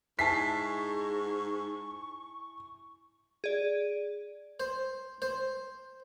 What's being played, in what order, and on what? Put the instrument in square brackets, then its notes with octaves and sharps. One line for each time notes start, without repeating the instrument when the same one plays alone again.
[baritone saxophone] G#2 [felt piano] E4 G#5 A5 [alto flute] C#6 [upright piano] B6 C7
[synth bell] G#4 D5
[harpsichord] C5
C5